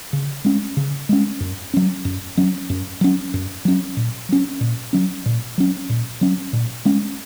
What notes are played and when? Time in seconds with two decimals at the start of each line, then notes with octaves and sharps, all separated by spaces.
0.13 C#3
0.44 G#3 C#4
0.77 C#3
1.09 G#3 C#4
1.40 F#2
1.74 F#3 C#4
2.05 F#2
2.37 F#3 C#4
2.70 F#2
3.01 F#3 C#4
3.34 F#2
3.65 F#3 C#4
3.97 A#2
4.29 F#3 C#4
4.61 A#2
4.93 F#3 C#4
5.26 A#2
5.58 F#3 C#4
5.90 A#2
6.21 F#3 C#4
6.53 A#2
6.85 G#3 C#4